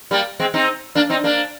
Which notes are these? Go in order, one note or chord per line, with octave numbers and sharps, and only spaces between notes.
G3 A#3
G#3 C4
C4 D#4
A#3 D4
C4 D#4
A#3 D4